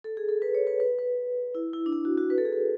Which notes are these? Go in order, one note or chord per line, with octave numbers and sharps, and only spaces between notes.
A4
G#4
A4
B4
C#5
B4
B4
B4
E4
E4
D4
E4
F#4
F#4
B4
A4
G#4
A4